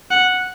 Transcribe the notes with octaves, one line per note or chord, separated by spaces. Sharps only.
F#5